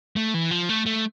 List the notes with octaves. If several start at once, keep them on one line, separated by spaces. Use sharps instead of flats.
A3
E3
F3
A3
A3